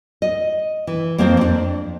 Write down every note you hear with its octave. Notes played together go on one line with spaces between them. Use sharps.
D#5
E3
F2 A#3 C4 A4 C5
F2 D4